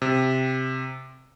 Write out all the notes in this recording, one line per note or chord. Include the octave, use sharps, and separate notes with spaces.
C3